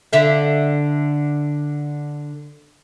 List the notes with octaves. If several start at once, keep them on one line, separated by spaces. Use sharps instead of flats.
D3 E5 F5